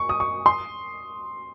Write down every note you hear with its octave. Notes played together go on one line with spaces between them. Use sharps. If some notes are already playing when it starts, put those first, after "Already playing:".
Already playing: C#6
D#6
C#6
C6